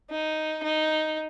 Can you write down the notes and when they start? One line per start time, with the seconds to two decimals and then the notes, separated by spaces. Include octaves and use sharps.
0.10 D#4
0.62 D#4